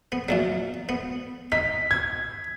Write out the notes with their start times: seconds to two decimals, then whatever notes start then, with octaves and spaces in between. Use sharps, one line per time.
0.12 B3
0.29 F#2 A#2 F#3
0.89 B3
1.52 D#4 B6
1.91 G#6